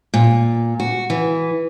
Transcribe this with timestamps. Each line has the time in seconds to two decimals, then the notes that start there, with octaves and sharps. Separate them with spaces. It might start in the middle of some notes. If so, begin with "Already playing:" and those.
0.14 A#2
0.80 F#4
1.10 E3